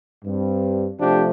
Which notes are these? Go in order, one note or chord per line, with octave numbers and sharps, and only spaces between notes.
G2 G3 C4
C3 F3 A3 D4 G4